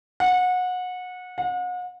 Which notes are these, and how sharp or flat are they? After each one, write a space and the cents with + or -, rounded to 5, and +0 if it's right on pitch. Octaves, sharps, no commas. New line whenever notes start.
F#5 -25
F#5 -40